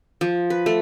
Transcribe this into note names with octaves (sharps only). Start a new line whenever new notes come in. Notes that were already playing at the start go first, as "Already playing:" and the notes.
F3
B4
A3